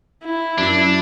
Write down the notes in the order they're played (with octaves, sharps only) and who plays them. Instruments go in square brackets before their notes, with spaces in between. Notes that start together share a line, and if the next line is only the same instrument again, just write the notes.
[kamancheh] E4
[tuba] F#2 [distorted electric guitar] D4